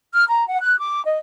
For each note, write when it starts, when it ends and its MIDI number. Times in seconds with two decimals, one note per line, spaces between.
0.15 0.25 89
0.28 0.45 82
0.50 0.58 78
0.62 0.78 90
0.79 1.01 86
1.05 1.19 75